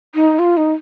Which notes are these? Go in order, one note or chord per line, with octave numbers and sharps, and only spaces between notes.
D#4
F4
D#4